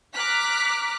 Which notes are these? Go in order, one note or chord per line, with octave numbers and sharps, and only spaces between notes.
A#5 D6 F6 F#6 B6